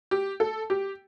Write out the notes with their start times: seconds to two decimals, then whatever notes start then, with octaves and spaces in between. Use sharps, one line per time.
0.11 G4
0.40 A4
0.70 G4